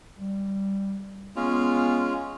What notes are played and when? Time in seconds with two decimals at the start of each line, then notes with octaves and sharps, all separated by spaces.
0.18 G3
1.36 G#3 B3 C#4 F4